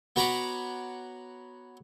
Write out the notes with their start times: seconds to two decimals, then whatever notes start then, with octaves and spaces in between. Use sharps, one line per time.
0.16 B3 F#4 C#5 A#5 B5 D6